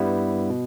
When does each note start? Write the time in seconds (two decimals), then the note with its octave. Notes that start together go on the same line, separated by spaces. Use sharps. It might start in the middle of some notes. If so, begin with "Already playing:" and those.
Already playing: G2 G3 B3 E4
0.50 B2